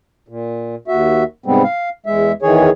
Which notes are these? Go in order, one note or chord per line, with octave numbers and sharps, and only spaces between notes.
A#2
D#2 F#4 E5
G#2 C3 G3 G#3 B3 C4
F5
E2 G#3 E5
E2 D#3 E3 G#4 C#5